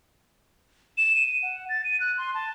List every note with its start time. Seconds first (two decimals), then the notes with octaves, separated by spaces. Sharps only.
0.98 E7
1.15 D#7
1.43 F#5
1.69 A6
1.84 D#7
2.00 F#6
2.18 C6
2.34 A5